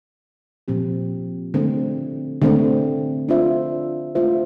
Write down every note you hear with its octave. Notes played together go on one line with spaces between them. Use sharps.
A#2 F3 C4 G4
D3 A3 C4
D3 A3 C4
A3 D4 F4 C5 E5
A3 D4 F4 C5 E5